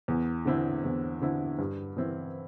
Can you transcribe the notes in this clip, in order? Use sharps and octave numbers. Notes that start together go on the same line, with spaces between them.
E2
D3 C4 E4
E2
D3 C4 E4
G2
E3 C4 E4